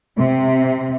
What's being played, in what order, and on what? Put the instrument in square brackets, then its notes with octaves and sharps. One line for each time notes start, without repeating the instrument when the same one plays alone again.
[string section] C3